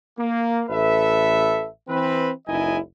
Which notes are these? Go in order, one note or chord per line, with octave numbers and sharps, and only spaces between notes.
A#3
A1 A4 B4 E5
E3 C4 B4
F#1 C#2 D#4 E4 D#5 G#5